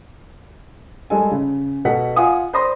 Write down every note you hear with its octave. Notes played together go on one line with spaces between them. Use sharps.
G3 G#3 A4 G#5
C#3
B2 A4 F#5 B6
F4 F5 F#5 G#5 D#6
C5 D5 B5 C6 D#6 A#6